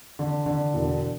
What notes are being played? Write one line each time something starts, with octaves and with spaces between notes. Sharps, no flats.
D3
D3
E1